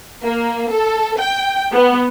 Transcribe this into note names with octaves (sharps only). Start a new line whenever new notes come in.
A#3
A4
G5
B3